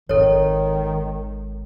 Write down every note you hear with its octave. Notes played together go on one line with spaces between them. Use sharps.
G#1 D#3 G#3 A4 C#5